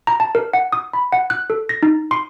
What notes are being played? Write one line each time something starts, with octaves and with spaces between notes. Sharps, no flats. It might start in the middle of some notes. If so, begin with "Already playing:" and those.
A#5
A5
A#4
F#5
D#6
B5
F#5
F#6
A4
A#6
D#4
C6